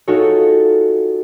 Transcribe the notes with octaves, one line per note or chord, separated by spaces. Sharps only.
D#4 F4 F#4 G#4 A4 C#5